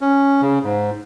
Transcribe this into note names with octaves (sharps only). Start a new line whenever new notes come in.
C#4
C#3
G#2